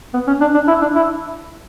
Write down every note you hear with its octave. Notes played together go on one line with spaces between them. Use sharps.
B3
C#4
D4
D4
E4
D4
E4